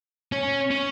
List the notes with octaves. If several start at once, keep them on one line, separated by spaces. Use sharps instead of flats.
C#4
C#4